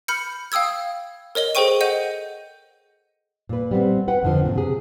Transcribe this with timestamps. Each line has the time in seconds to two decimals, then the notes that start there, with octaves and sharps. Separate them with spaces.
0.08 B5 F6 G6 C#7
0.52 F5 G5 D#6 E6 G#6
1.35 A#4 C#5 D#5 G7
1.55 G#4 A4 C5 G5 C#6 D#7
1.81 D#5 F#5 G6 D#7
3.49 A#2 B4
3.71 G3 B3 C4
4.08 B4 F#5 G5
4.23 F2 D3 F3
4.43 A#2 C4
4.55 C3 G#4